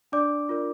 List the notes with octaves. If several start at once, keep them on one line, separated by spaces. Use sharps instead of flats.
D4 D5 D6
F4 A#4 D5